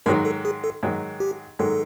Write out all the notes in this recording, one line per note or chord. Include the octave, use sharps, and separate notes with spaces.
G#2 D#3 F#3 A#4
A4
G#4
A4
G#2 D#3 F#3
G4
G#2 D#3 F#3 A4